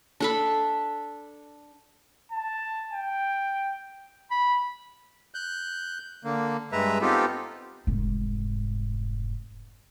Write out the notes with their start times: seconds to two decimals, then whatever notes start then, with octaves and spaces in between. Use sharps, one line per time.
0.20 D4 A4 B5
2.32 A5
2.92 G5
4.31 B5
5.34 F#6 G6
6.25 D3 A#3
6.72 G2 G#3 B4 E5 A#5
7.02 B3 C4 D#4 F4 G4 A4
7.87 F1 G#2